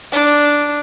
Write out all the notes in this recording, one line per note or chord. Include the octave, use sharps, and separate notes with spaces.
D4